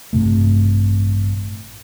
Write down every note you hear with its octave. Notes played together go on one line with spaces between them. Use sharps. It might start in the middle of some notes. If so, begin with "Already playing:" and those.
A1 G2 C3 A3